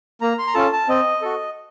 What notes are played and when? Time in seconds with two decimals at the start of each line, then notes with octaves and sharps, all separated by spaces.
0.21 A#3 A#5
0.39 C6
0.47 A#5
0.54 C#4 F4 A4 A5
0.72 A5
0.89 C4 D#5
1.22 F#4 A4